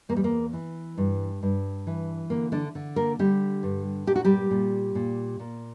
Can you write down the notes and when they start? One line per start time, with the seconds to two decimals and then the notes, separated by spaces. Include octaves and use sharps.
0.09 E2 A#3
0.17 G3
0.24 A#3
0.53 E3
0.97 G2
1.42 G2
1.87 E3
2.30 D3 A#3
2.52 D3 D4
2.75 D3
2.96 A#3 A#4
3.19 D3 G3 G4
3.63 G2
4.07 A#2 G4
4.16 F#4
4.25 G3 G4
4.51 A#2
4.95 A#2
5.39 A#2